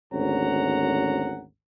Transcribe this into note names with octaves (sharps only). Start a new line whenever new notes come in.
G#1 D2 C#4 F#5 A#5